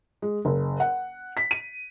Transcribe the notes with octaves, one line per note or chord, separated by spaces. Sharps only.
G#3
F#1
F#5
B6
D#7